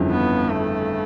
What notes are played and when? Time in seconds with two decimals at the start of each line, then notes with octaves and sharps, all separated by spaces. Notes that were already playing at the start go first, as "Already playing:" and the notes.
Already playing: G1 F2 C#3 E3
0.10 B3
0.50 A3